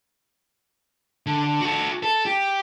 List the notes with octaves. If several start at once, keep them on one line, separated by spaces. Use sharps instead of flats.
D3
F#4 A4
A4
G4